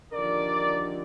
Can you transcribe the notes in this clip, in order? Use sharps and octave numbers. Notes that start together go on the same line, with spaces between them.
D#2 D3 F3 A#4 D5